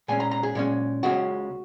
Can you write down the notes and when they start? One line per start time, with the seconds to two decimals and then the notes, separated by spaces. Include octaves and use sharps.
0.08 A#2 G#3 C#4 G#5
0.20 A#5
0.31 A#5
0.43 G#4
0.55 A#2 G#3 C#4
1.03 C#2 C#3 G#3 C#4 F#4